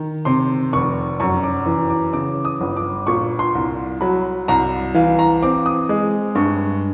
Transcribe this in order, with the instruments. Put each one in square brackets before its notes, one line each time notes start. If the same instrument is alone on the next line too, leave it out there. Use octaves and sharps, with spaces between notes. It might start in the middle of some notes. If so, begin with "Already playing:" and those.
Already playing: [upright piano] D#3
C3 C6
F1 C#6
F#2 C#6
D6
E3
D6
C#3 D6
D#6
G1
D6
A#2 C#6
C6
C2
F#3 B5
C2 A#5
E3 F5
A#5
C4 D6
D#6
G#3
G2 C#6